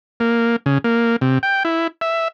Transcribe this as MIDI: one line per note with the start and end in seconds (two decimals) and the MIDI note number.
0.20 0.56 58
0.66 0.78 49
0.84 1.16 58
1.21 1.39 48
1.43 1.63 79
1.65 1.87 64
2.01 2.28 76